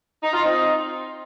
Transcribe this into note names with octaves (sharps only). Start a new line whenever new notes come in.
D#4
F4
C4 D#4